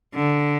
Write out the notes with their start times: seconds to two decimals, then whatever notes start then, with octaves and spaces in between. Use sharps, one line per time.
0.14 D3